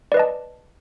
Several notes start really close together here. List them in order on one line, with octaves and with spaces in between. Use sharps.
D5 B4 D#5 A5